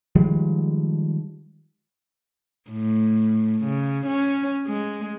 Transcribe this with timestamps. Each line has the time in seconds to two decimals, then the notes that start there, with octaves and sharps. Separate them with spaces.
0.15 D#3 F3 G3 G#3
2.70 A2
3.64 C#3
4.06 C#4
4.67 G#3